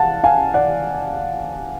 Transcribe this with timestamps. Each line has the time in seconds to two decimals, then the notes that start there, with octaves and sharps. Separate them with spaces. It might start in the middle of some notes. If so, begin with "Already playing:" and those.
Already playing: F5 F#5 A5
0.24 F5 G#5
0.54 D5 F#5